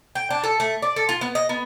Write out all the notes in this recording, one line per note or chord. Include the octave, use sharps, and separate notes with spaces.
G5
D4
A4
A3
D5
A4
F4
B3
D#5
B3